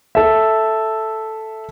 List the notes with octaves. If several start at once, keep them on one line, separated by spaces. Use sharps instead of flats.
A4 E5